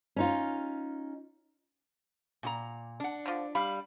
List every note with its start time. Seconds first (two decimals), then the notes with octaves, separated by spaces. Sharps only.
0.16 C#4 D#4 F4
2.43 A#2 F4 A#5
3.00 D4 F#5
3.26 D3 F3
3.55 G3 F5 B5